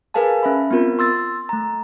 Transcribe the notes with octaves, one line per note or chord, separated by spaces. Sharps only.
G#4 A#4 B4 F5 G#5 A5
C#4 E5 B5
B3 C4 F4 A#4
C6 E6 A6
A3 A#5